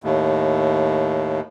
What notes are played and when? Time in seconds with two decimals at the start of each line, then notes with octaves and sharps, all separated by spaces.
0.04 D#2 A2